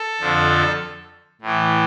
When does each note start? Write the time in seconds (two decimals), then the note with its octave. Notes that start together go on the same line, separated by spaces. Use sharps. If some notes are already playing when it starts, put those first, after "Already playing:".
Already playing: A4
0.20 F2 D3 F3
1.42 A2 E3